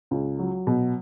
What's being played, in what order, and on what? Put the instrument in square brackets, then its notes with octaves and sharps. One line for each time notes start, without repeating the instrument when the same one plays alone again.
[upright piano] C#2
F#3
B2